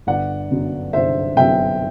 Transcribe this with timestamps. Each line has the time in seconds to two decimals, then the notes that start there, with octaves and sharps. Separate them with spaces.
0.07 G1 D5 F#5
0.51 F#2 D3 F#3 B3
0.93 G1 C5 E5
1.36 F#2 D3 F#3 B3 E5 G5